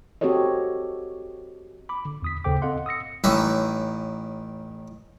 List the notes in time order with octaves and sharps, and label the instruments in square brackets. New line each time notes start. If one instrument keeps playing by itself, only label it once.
[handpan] C4 F#4 G4 A4 C#5 D#5
[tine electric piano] B5 D6
D3
E2 D#6 B6
D#2 C#3 A4 C5 G5 D6
C4 A4 D#5 F5 F#5 C6
D#6 E6 A#6 C#7
[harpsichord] A1 D#3 C#4 B4 E5 D6